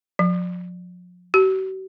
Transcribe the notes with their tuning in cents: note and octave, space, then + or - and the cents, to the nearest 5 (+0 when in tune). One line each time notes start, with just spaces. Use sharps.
F3 +40
F#4 +45